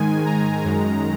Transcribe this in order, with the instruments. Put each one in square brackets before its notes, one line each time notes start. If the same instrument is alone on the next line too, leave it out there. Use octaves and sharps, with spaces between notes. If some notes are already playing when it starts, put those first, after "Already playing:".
Already playing: [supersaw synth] G#2 D#3 G#3 G#5
A#5
F#2 D#3 G#3